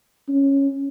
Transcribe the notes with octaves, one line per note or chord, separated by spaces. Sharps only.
C#4